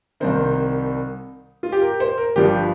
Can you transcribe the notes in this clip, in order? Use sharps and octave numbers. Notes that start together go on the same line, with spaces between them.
C2 C3 D#3 C5
F4
G4
A#4
C5
A#4
G1 G2 F3 G4